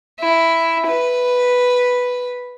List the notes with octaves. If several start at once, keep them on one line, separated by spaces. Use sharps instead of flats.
E4
B4